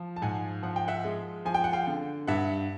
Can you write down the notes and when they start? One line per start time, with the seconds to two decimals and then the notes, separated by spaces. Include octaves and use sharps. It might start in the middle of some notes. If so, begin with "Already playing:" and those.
Already playing: F3
0.16 A5
0.22 G#2 F#5 G#5
0.63 F3 F#5
0.76 G5
0.88 E5 F#5
1.04 G#3
1.45 F3 G#5
1.54 G5
1.64 F#5
1.73 F5 G5
1.87 D3
2.27 G2 E5 F#5